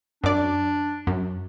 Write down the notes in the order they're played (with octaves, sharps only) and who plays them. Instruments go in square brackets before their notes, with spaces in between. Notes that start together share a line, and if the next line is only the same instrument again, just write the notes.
[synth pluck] F#2 D5 [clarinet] D4
[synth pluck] F#2